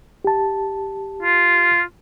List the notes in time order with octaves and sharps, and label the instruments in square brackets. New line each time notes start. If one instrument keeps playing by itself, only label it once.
[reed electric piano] G4 A5
[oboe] F4